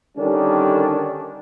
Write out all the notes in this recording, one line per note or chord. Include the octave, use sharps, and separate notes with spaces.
D3 D#3 G3 C#4 D4